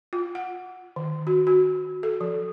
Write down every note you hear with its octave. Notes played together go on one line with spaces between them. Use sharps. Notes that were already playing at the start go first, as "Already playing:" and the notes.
F4
F#5
D#3
F#4
F#4
A4
F3